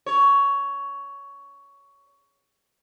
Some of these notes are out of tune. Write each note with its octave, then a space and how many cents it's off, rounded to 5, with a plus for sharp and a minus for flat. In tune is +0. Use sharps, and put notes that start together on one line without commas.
C#5 +15